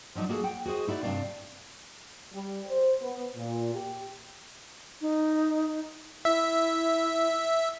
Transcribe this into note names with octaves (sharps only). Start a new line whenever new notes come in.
F3 F#3 D4 D#4
A#3 F#4 G#4 A4
F#5 G5
F#4 G#4 C5 D#5
D#4 E4 F#4 C#5 D5
G2 C3 A#3 D4 D5 F5
G3
C5
B3
A#2
G4
D#4
E4 E5